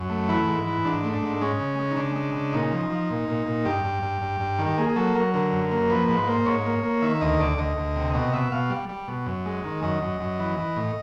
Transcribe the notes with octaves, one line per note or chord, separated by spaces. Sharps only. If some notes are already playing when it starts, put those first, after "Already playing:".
Already playing: F#2
A3
E3 E4
G#2
E3
G#2 D4
A3
D4
G#2
G#3 C#4
C#3
G#3
D#4
C#3 D4
G#3
C#3
A#2 D#4
F3
F3
A#2
A#2
A#2
G2 G4
G2
G2
G2
G2
D#3
G4
A#3 G#4
G#4
F#3 A4
F#3 A#4
D3 A#4
F#2
A#3
F3 B4
G#2 B4
A#3 C5
G#2 C#5
A#3
A#3
D#3 E5
D2 D#5
D2 D5
D2 D#5
D2
C3
B2 D#5
B2 E5
B2 F5
G3
G3
B2
F#2
G#3
D#3
F#2 D#5
F#2
F#2
E3
E3
A2